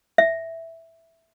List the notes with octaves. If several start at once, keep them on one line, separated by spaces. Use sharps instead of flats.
E5